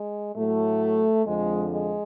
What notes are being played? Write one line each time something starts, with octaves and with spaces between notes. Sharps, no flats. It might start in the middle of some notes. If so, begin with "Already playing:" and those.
Already playing: G#3
A2 F#3 A3
F2 D3 F3 G#3
G#3